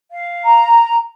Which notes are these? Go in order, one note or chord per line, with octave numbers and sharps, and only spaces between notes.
F5
A#5